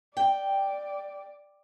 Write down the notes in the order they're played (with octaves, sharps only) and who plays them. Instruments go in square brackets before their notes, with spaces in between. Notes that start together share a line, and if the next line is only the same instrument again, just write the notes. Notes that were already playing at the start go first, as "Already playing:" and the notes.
[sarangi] D5 [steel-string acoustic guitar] G5